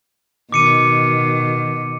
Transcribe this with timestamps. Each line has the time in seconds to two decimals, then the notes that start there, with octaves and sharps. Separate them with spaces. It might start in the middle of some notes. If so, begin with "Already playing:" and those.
0.52 B2 D#3 D6 C#7 D#7